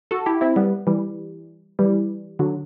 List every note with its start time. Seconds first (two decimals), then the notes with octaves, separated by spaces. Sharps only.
0.11 F#4 A4
0.26 E4 G4
0.41 C4 E4
0.56 G3 B3
0.87 E3 G3
1.79 E3 G3
2.39 D3 F#3